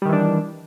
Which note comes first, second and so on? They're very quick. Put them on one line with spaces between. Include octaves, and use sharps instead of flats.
G3 D#3 E3 D4